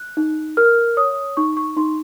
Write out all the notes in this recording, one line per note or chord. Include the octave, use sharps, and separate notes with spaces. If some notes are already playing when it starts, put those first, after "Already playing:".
Already playing: F#6
D#4
A#4 F6
C#5 D#6
D#4 C#6
C#6
D#4 C6